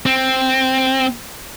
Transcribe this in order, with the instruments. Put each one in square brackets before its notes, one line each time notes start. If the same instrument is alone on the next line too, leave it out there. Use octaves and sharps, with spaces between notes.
[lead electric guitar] C4